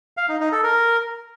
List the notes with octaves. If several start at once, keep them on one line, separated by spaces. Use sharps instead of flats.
F5
D#4
D#4
A4
A#4